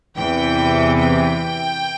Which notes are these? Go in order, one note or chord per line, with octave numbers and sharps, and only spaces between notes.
E2 C3 E3 G5
G5